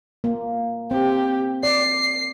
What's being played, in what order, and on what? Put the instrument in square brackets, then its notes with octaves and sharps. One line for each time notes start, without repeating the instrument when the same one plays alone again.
[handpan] A#3
[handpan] C4 [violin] G4
[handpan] D5 [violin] C7